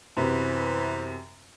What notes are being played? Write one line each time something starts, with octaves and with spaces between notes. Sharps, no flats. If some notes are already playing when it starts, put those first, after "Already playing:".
F#2 C3 E3 B3 C5